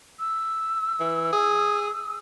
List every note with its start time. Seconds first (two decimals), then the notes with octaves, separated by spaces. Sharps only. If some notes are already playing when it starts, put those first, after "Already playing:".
0.20 E6
1.00 E3
1.33 G#4